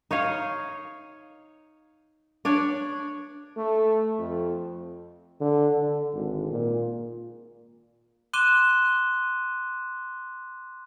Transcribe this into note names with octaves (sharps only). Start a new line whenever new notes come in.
D#4 C#5 D#5 F5
D4 C#5 D5
A3
F2
D3
D3
G#1
A#2
C6 D6 F#6 D#7 E7 G7